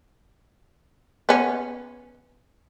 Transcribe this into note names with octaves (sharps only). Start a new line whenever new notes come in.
B3 C#4